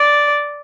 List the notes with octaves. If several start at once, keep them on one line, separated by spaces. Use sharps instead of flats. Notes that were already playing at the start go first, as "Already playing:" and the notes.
Already playing: D5